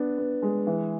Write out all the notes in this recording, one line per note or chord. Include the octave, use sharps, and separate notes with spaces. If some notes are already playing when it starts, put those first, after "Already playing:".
Already playing: B3 D4
B3
G#3
E3